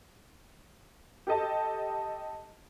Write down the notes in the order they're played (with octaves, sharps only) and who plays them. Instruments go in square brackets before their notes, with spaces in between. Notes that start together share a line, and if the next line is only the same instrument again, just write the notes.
[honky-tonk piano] G4 A4 D#5 A5